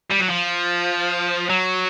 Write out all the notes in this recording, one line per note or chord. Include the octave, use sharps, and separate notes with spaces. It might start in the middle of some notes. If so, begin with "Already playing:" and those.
G3
F#3
F3
F#3